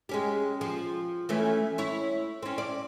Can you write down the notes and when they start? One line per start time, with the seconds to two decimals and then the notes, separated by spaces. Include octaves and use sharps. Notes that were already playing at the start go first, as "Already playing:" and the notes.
0.09 G#3 C#4 G4
0.61 F3
1.29 E3 A3 C#4
1.78 E4 C#5
2.42 C4 C#4
2.58 D5